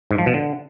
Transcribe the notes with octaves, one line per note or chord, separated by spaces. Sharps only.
G#2
F3
B2
D3